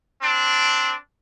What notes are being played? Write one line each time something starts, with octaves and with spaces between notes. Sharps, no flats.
C4 D4